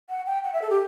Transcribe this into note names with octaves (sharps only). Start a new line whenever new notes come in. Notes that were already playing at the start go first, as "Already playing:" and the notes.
F#5
G5
F#5
E5
A4
G4